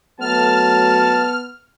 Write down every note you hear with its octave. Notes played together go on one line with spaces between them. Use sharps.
F#3 A3 B3 A5 F6